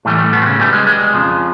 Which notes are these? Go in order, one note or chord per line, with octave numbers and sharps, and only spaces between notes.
A2 E3 G3 A3
A3
B2 B3
C4
C#3 C#4
B2 G3 A3
G#3
G#3
G#3
F2 C#3 F3